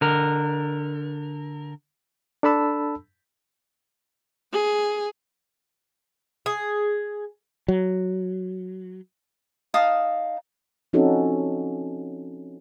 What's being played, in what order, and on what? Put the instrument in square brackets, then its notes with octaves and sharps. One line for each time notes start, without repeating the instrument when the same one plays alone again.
[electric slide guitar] D3 A#4
[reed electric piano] D4 A4 A5 B5 E6
[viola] G#4
[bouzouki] G#4
[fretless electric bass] F#3
[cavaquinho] D#4 F5 A5 D#6
[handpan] F3 C4 C#4 D#4 F#4 A4